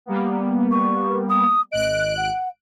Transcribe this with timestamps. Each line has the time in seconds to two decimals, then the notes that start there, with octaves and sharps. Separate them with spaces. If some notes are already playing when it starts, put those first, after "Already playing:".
0.06 G3 A#3 B3
0.71 C#6
1.29 D#6
1.72 G#1 D#5 F#6 D7
2.17 F#5